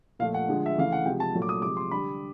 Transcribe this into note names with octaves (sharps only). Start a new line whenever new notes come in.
A#2 F3 A3 F5
F#5
D3 F3 G#3
E5
C#3 E3 A3 F5
F#5
C3 F3 G#3 G5
A5
A#2 F#3 A3
D6
D#6
C3 F3 G#3 D6
C6
D3 G3 B5